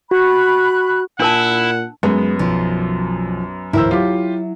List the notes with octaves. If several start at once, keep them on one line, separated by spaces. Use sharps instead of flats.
F#4 B5 F#6
A#2 D4 E4 A#4 F#5 A5
F#2 G#3 B3
B1 F3
D1 E3 E4 A#4 C5 E6
F#3 F4 G4